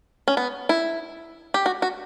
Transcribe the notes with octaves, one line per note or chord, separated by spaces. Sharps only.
C#4
B3
E4
G4
F#4
F#4